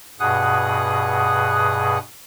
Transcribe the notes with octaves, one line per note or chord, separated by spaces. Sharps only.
G2 B2 G#4 F#5 D#6 F#6